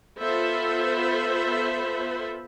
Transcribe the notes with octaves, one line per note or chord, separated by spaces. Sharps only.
B3 F4 A4 C5 E5 B5